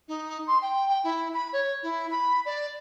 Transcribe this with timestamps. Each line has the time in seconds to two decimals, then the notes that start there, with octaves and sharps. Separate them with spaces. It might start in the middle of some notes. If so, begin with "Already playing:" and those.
0.08 D#4
0.47 C6
0.62 G5
0.89 G5
1.04 E4
1.33 B5
1.53 C#5
1.83 E4
2.11 B5
2.46 D5